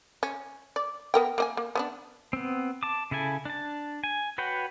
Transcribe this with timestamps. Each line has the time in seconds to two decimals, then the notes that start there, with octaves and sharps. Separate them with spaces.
0.23 C#4
0.76 D5
1.14 B3 A#4 G5
1.38 A#3 D#5 G#5
1.57 A#3
1.75 B3 C#4 D4
2.33 B3 C4
2.83 A5 D6
3.11 C#3 E4 A4 G#5
3.45 D4 A5
4.04 G#5
4.38 F#4 B4 C#5 F#5 G5